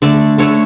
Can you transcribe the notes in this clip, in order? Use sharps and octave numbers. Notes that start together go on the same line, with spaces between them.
D3 A3 D5
D3 A3 C#5